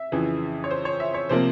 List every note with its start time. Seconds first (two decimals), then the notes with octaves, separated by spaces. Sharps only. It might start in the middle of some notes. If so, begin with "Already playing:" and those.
Already playing: E5
0.12 F2 C#3 E3
0.64 C#5
0.71 C5
0.85 C#5
1.00 E5
1.14 C#5
1.29 C3 F3 A#3 C5